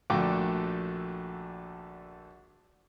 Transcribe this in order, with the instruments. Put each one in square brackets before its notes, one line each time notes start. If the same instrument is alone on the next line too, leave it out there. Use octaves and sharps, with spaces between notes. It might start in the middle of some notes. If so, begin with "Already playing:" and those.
[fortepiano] A#1 D3 A3 F#4 G5 D6